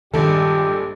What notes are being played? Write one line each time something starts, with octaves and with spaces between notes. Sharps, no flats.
A#1 G2 D#3 G3 G#3 G4 A4